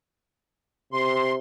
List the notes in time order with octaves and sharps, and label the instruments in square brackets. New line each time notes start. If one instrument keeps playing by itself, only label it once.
[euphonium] C3 [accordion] C6